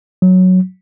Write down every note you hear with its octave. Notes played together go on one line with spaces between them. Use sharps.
F#3